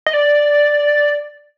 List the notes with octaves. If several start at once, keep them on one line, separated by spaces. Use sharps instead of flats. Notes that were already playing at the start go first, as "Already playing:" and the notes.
D#5
D5